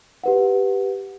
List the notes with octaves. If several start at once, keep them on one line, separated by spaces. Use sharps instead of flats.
G4 B4 F#5